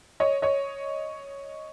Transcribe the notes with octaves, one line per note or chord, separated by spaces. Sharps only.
C#5 D#5
C#5 D#5